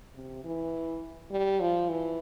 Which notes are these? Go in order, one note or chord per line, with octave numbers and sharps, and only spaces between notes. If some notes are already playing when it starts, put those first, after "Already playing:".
C3
E3
G3
F3
E3